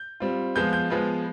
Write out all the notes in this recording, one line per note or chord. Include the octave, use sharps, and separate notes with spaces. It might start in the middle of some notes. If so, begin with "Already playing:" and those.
Already playing: G6
G3 C4 F4
F3 G#3 B3 F4 G6
G6
F3 G#3 B3 F4